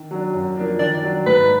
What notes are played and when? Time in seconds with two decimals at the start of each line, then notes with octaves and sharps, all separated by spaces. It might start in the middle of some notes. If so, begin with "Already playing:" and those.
Already playing: D#3
0.11 F#3 D4
0.34 F#2
0.57 F3 A#3 D4
0.79 D#3 D5
1.03 F#3 D4
1.26 G#2 B4